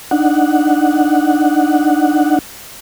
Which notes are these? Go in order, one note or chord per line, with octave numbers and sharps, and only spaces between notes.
D4 D#4 F#5